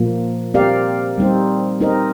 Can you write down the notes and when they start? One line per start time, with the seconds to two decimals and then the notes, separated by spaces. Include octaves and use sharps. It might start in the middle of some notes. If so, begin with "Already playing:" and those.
Already playing: A#2 F3 A#3
0.54 C4 G4 A#4 D5 F5
1.18 G3 C4 D#4
1.81 C4 D#4 A#4 D#5